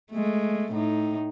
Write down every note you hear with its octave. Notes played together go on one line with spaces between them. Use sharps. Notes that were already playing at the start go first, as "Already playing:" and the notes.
G#3 A3
A2 D#4